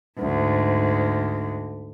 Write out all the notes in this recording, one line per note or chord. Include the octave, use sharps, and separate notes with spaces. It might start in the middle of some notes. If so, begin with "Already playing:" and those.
D2 G#2